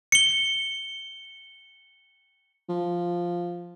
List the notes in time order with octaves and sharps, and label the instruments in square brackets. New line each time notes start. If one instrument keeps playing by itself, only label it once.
[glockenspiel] C#7 G7
[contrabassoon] F3